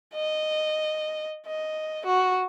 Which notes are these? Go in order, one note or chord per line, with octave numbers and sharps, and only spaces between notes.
D#5
D#5
F#4